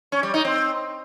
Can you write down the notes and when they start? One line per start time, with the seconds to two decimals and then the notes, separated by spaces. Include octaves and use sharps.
0.12 C#4
0.23 G3
0.34 D#4
0.45 C4